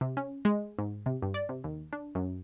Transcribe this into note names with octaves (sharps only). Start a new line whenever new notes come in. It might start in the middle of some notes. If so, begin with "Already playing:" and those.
C3
C#4
G#3
G#2
C3
G2
D5
C3
D#2
D4
F#2